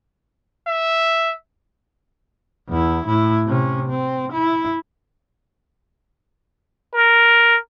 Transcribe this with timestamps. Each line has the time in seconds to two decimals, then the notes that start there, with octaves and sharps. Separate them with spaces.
0.67 E5
2.69 E2 E4
3.06 A2 E4
3.46 C3 C#4
3.90 C4
4.32 E4
6.94 A#4